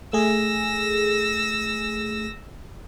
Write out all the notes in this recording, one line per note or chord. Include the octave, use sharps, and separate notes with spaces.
A3 G#4 E6 A#6